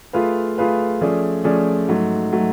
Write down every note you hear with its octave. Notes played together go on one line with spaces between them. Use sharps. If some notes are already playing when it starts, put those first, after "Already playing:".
A3 F4 G#4 B4 F5
A3 F4 G#4 B4 F5
F3 A3 C#4 G#4 D5
F3 A3 C#4 G#4 D5
G#2 F#3 A3
F#3 A3